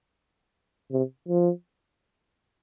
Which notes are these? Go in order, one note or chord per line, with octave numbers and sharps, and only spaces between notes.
C3
F3